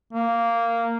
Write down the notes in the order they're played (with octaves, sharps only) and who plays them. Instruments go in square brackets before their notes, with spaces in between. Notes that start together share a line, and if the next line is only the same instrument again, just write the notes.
[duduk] A#3